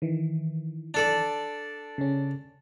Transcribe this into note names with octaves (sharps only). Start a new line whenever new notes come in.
D#3 E3
D4 A4 D5
C#3 C#4